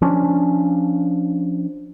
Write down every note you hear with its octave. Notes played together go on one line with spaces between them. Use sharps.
F3 C#4 D4